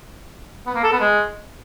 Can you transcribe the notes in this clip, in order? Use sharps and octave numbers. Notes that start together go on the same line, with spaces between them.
B3
A#3
A4
B3
G#3